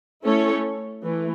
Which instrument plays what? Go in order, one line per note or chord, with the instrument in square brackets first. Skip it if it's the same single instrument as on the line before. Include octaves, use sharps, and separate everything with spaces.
[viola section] A3 C#4 E4 A4 C#5
E3 A3